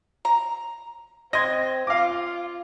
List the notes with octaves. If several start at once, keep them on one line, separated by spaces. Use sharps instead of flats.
A#5
C4 D#5 C6 G#6 A#6
F4 F5 D6